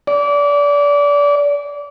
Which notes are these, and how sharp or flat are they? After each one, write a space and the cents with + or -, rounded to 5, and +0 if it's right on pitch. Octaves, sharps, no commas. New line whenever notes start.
D5 -25